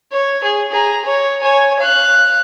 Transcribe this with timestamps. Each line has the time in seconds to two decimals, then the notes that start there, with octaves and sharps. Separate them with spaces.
0.12 C#5
0.43 G#4
0.72 G#4 A#5
1.05 C#5
1.41 C#5 G#5
1.80 F5 F#6